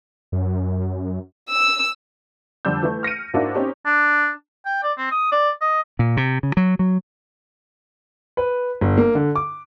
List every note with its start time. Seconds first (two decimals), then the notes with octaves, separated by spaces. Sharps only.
0.32 F#2
1.51 E6
2.65 F2 D3 G3 D4 E6 G6
2.83 E3 A3
3.03 F6 A#6 C#7 D#7
3.34 G#2 A#3 D4 E4 F#4
3.55 C4 C#4 D#4 G4
3.86 D4
4.66 G5
4.83 D5
4.98 C4
5.11 D#6
5.32 D5
5.61 D#5
5.99 A#2
6.17 C3
6.43 C#3
6.57 F#3
6.79 F#3
8.37 B4
8.81 G1
8.98 A#3
9.15 D3
9.35 D6